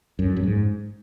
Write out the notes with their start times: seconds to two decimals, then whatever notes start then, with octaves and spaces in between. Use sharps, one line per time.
0.19 F#2
0.37 F#2
0.44 G#2